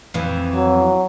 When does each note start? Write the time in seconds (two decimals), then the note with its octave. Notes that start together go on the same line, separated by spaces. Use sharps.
0.14 F2 E3
0.55 F#3